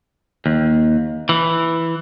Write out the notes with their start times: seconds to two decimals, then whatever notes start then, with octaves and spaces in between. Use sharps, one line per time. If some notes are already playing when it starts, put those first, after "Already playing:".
0.46 D#2
1.29 E3